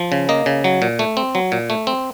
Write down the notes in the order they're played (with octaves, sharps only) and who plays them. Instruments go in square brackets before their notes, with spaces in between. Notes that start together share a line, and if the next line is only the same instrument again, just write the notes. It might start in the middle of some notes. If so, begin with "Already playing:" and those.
Already playing: [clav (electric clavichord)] F3
C#3
A#3 D#5
C#3
F#3
A#2
A3
C4
F#3
A#2
A3
C4